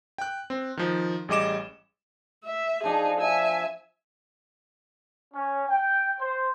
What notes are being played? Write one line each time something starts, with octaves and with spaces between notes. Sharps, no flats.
G5 F#6
C4
D#3 F3
A1 G3 G#4 D#5 D6 E7
E5
F3 D4 D#4 G#4
E5 G#5
C#4
G5
C5